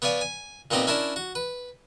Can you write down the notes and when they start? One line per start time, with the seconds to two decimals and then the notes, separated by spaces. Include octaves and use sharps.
0.02 B3 C#5 D5 F5 G#5
0.21 G#5
0.71 A#2 B3 C4 D#4 G4 A#5
0.87 C#4 D4 E4 A#4 A5
1.16 F#4
1.35 B4